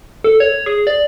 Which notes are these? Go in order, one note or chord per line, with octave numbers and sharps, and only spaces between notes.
A4
C#5
G#4
D5